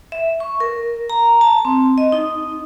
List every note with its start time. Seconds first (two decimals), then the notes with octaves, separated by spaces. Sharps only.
0.12 E5
0.40 C#6
0.60 A#4
1.10 A#5
1.41 A5
1.65 C4
1.98 D#5
2.12 D#4